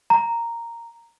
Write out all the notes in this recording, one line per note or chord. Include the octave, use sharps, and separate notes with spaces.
A#5